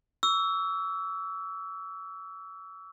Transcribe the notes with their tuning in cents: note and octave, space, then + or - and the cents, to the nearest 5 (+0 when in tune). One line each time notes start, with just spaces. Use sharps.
C#6 +45 E6 +0